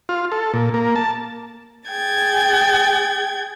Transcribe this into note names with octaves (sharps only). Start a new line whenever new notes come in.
F4
A4
A#2
A#3
A5
G#4 G5 G#6 A6